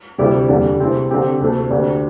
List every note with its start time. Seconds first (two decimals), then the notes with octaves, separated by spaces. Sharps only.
0.18 D2 C3 G3 E4 G4
0.49 E2 D3 G3
0.79 C3 A3 C4 E4
1.10 D3 C4 G4
1.41 D2 C3 A3
1.70 D2 D3 A3 D4 G4